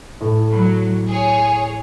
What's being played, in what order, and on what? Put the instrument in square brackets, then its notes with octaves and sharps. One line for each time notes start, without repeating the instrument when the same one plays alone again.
[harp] A2
[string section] F#3 [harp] B5
[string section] G#4 C#5